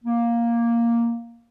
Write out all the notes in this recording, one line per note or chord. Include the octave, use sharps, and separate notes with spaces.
A#3